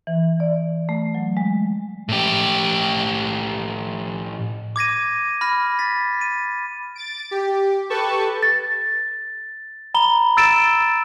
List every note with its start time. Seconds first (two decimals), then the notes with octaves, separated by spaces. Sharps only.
0.07 E3
0.40 D5
0.89 A3
1.15 F#3
1.37 G#3
2.09 A2 G4
4.76 D6 G#6 A#6 D#7
5.41 B5 F6 A#6
5.79 A6 B6
6.21 D#7
6.95 A6 D7
7.31 G4
7.90 G4 A4 B4 A5 C#6
8.43 A6
9.94 A#5 B5 G7
10.37 E6 A6 D7 E7